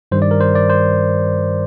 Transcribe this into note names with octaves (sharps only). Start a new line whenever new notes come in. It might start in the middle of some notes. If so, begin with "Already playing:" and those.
G2 D#3 G3 C5
D5
A#4
C5
D5
C5